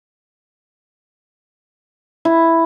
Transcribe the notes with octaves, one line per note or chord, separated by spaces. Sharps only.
E4